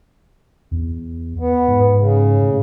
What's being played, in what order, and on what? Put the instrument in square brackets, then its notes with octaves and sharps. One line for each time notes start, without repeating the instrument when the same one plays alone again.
[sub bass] E2
[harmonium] B3
[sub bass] G#2
[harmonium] C#3
[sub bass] A2